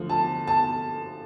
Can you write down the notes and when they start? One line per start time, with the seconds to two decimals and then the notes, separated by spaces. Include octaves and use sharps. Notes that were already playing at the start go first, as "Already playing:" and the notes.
Already playing: D3 F3 A3
0.09 A5
0.47 A5